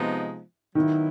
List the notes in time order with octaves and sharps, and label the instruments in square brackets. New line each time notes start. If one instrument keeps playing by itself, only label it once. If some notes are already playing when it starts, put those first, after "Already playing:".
Already playing: [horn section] C3 F3 G#3 B3 D#4
[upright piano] D#3 [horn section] F#3 B3 E4